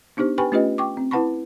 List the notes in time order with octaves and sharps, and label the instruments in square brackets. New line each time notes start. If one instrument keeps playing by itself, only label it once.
[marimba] B3 D4 D#4 G4 C5
G4 B4 G5 G#5 B5 C#6
A3 C#4 F4 G4 B4 D#5
G5 C#6 D6
C4
E4 B4 F#5 A5 B5 C#6